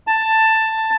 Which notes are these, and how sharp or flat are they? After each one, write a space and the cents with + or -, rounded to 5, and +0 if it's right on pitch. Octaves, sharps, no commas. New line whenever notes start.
A5 +10